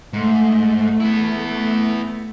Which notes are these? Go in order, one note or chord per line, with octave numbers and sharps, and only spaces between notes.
G#2 A3
B3 E4